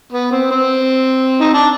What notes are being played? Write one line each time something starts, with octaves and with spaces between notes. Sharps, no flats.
B3
C4
C4
D#4
D4